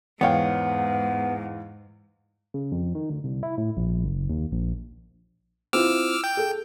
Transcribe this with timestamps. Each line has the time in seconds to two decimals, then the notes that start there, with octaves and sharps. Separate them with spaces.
0.21 E2 G#2 B3 C#5 F5 G5
2.54 C#3
2.72 F2
2.95 D#3
3.10 D2
3.24 C2
3.43 E4
3.58 A2
3.77 A#1
4.05 F#1
4.30 D#2
4.52 A#1
5.73 C4 E4 F4 D6 E6 F6
6.24 G5
6.37 G#4 A4